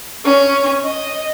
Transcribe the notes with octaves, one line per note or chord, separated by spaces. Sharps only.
C#4
D#5